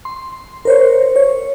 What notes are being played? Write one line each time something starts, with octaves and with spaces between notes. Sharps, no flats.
C6
A#4 C5 C#5
C#5